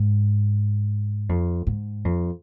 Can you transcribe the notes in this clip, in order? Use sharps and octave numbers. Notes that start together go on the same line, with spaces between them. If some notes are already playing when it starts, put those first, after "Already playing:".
Already playing: G#2
F2
G#2
F2